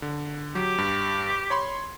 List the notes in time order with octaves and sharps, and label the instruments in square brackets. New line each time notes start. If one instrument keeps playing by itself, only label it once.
[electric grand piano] D3
[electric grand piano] F#3 [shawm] G4
[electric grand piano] G2
C#5 B5 C6